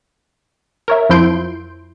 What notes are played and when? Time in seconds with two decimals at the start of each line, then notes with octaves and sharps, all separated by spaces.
0.88 A#4 C#5 E5
1.09 F2 F3 E4 C6 G6 D7